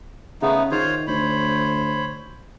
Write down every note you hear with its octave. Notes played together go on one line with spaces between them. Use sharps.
C#3 A3 B3 D#4
D#3 F4 C5 C#5
D2 C5 C#5 B5